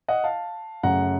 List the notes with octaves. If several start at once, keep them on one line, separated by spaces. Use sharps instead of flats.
D#5 F#5
F5 A5
F#2 C#3 F#3 A3 F#5 A#5